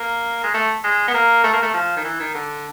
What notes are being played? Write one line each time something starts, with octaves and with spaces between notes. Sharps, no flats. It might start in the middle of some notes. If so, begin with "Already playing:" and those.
Already playing: A#3
G#3
A3
G#3
B3
A#3
A3
A#3
A3
F3
D#3
E3
D#3
D3